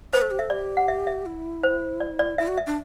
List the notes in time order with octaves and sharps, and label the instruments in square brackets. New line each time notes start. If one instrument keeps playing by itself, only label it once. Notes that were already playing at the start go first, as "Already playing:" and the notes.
[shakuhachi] B4 [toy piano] C5
[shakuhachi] A4
G4
[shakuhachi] A4 [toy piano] E5
[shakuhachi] G4 [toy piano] D5
[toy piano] F#5
E5
E5
[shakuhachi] E4
[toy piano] C5
D5
D5
[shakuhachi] E4 [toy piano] E5
[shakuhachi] F#4
[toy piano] E5
[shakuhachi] D4